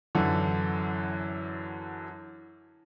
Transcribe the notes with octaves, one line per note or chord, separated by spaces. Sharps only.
F#2 D3 E3